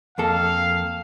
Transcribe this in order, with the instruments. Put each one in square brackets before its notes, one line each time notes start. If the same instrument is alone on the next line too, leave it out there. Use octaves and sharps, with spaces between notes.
[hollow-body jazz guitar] F2 A#3 A4 [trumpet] F5